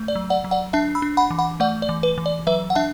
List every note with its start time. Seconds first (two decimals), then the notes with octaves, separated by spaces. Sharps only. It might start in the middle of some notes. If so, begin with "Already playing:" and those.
Already playing: A3
0.08 D5
0.15 F#3
0.30 D5 F#5
0.44 F#3
0.51 D5 F#5
0.73 D4 E5 A5
0.95 B5 E6
1.02 D4
1.17 F#5 B5
1.31 E3
1.39 F#5 B5
1.60 A3 D5 F#5
1.82 D5
1.89 E3
2.03 B4
2.18 E3
2.26 D5
2.47 F#3 B4 E5
2.70 F#5
2.75 D4 E5 A5